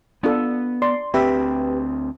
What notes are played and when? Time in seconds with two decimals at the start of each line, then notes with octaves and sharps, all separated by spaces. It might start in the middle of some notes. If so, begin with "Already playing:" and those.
0.23 B3 D4 F4 A4
0.82 D5 C6
1.14 D2 C4 G4 B4 E5